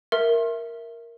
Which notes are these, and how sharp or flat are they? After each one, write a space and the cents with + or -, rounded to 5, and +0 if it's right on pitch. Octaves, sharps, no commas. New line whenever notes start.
A#4 +0 E5 +0 C6 +35